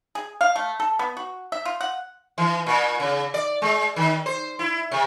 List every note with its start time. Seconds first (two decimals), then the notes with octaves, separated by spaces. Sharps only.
0.15 G#4
0.41 F5
0.56 A3
0.80 A4
0.99 B3
1.17 F#4
1.52 E5
1.65 F4
1.81 F#5
2.38 E3
2.66 A#2
3.00 C#3
3.34 D5
3.62 G#3
3.96 D#3
4.26 C5
4.59 E4
4.91 C3